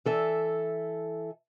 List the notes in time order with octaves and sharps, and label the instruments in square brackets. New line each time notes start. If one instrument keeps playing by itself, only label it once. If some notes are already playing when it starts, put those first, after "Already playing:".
[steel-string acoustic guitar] E3 A4 E5